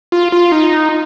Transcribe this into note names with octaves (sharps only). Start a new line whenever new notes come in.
F4
F4
D#4